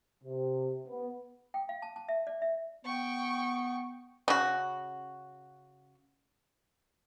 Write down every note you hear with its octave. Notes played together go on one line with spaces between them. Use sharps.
C3
B3
G5
F5
A5
A5
E5
D5
E5
B3 G5 C#6
C#3 F#4